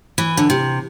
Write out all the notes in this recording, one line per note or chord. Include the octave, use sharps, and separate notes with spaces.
E3
D3
C3